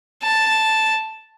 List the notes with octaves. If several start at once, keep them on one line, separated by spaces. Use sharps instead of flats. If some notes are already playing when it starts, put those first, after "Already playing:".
A5